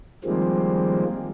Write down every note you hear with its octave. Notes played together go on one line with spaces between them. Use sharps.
D#3 F3 G3 G#3 A#3 C4